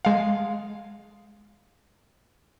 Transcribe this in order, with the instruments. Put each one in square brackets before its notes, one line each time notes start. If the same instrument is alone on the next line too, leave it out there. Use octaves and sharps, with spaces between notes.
[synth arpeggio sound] G#3 F5